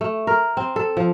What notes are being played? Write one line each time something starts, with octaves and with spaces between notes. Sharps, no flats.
A3
A#4
C4
A4
F3